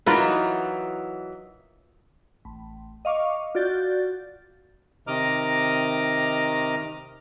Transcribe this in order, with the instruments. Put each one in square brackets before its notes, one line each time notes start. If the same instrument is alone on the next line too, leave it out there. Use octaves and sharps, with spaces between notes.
[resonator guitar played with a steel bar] E3 F#3 D#4 [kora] F4 A#4 B4
[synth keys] A1
D#5 F5 C#6 D6
F4 F#4 D5 G6 A6
[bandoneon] C3 D#3 D#5 A#5 D6 F6